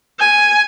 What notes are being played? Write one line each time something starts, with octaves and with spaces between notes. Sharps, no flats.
G#5